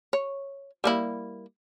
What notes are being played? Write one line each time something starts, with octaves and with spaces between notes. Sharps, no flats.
C#5
G3 A#3 E4